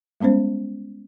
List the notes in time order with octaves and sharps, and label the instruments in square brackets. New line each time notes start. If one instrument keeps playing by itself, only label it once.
[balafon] G3 G#3 B3 C#4 C5